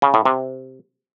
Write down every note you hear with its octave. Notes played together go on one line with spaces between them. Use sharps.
C#3
A2
C3